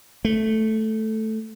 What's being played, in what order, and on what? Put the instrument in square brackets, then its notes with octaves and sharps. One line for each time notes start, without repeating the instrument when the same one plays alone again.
[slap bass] A3